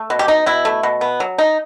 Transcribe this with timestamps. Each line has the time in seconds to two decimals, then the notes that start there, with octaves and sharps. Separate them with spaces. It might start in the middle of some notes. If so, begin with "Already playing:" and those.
Already playing: A3
0.10 B2
0.19 G4
0.28 D#4
0.46 B2 E4
0.65 A3
0.83 B2
1.01 B3
1.20 F#3
1.38 D#4